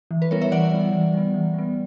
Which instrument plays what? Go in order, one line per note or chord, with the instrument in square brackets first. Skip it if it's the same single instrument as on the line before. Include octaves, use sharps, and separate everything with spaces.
[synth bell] E3
B4
G3 B3 E4 A#4 C#5
C#5 E5
E3 D5 F#5
G3 B3 E4
E3
G3 B3
E3
G3 B3